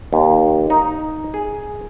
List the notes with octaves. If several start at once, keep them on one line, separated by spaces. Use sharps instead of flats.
D#2
D#4
G#4